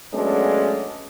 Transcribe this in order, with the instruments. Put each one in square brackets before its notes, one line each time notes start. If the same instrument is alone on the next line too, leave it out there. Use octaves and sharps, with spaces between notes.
[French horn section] F#3 G#3 A3 B3 C#4 D4